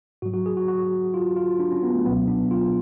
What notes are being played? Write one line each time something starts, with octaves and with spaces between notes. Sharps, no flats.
G#2 F#3 F#4
F#4
G#4
F#4
F#4
F4
F4
D4
C#4
B3
A3
C#2 B2 F#3 B3
D4
F4